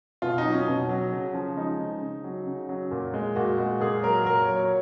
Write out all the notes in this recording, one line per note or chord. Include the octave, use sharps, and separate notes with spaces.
B2 F4
D#4
F#3
C#4
B2 C#4
F#3
C#3
F3
G#3 D#4
C#3
C#3
F#3
C#3
F#3
A#2
G#3
A#2 F#4
G#3
A#2 G#4
F#3 A#4
A#2 A#4
C#5
F#3
C#5